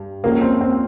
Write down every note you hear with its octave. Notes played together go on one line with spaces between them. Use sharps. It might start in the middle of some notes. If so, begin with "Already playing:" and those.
Already playing: G2
C#2 C#3 F3 G#3 A#3 C#4
C4
C4